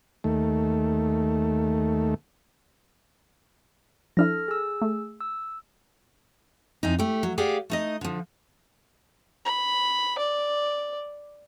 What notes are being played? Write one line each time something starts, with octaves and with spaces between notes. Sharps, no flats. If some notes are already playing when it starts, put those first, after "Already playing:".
D#2 A3
F3 D4 E4 A4 F6 A#6
G#4 E6
A3
E6
F2 E3 D#4
A3 G4
F#3
G4 G#4 D5 F5 F#5
A3 D#4 D#5
D3 F3
B5
D5